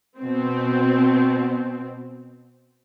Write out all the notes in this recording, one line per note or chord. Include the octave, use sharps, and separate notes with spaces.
B2 C4